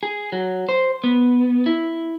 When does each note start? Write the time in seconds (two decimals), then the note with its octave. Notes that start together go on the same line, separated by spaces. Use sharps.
0.03 G#4
0.32 F#3
0.69 C5
1.04 B3
1.66 E4